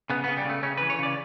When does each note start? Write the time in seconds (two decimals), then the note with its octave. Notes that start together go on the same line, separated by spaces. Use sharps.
0.10 C#3 B3
0.24 C#3 B3
0.37 G3
0.45 C#3 A3
0.63 C#3 C#4
0.77 E3 B4
0.90 C#5
0.99 C#3 D5